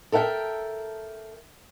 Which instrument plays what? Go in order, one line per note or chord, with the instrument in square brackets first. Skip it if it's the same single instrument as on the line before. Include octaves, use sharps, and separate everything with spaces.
[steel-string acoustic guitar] A4 A#4 E5 F#5 G5